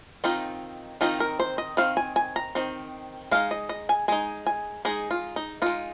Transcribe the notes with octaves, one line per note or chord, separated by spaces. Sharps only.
D#3 C4 D#4 F4
D#3 C4 D#4 F4
A#4
C5
D#5
D#3 C4 F5
G#5
G#5
A#5
D#3 C4
G#3 D#4 F5
D#5
D#5
G#5
G#3 D#4 G#5
G#5
G#3 D#4 G#4
F4
D#4
G#3 D#4 F4